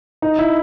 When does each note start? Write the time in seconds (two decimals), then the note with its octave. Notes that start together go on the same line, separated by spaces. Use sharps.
0.22 D#4
0.39 E4